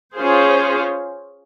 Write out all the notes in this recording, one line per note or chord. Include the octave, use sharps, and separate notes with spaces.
C#4 F4 G#4 C5